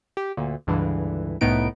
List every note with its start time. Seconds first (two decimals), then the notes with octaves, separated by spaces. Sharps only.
0.17 G4
0.37 D2 A#2
0.67 C#2 G2 D3 E3
1.41 C2 A2 B3 D#4 D7